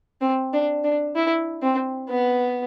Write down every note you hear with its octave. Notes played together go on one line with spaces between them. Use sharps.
C4
D4
D4
E4
C4
B3